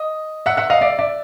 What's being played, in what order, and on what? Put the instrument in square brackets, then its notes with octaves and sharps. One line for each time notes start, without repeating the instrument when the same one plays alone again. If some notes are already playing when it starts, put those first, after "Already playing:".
Already playing: [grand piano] D#5
E5 F#5
E5 F#5
D#5 F5
D5 E5
D5 E5